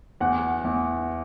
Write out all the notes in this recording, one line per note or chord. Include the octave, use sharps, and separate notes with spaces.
E2 F#5
E2